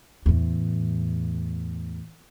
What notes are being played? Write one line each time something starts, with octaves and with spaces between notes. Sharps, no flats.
E2 A2